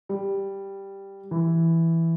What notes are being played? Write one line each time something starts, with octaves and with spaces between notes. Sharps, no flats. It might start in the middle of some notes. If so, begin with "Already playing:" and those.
G3
E3